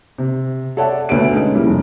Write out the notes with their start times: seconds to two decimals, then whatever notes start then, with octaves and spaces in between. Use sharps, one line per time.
0.18 C3
0.77 A4 C#5 D5 E5 F#5 A5
1.09 D2 B2 A4 B4 C#5 D7
1.35 G#3 C#4 D#4
1.55 G3 A#3 E4
1.67 F1